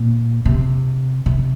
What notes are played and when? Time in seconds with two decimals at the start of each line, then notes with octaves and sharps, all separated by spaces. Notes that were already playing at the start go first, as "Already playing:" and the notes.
Already playing: A#2
0.45 C3
1.26 C3